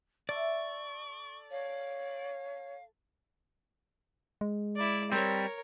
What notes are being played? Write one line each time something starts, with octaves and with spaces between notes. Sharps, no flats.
A4 D5 E5 C#6
C#5 F5
G#3
E4 D5
G3 C4 A#4 C#5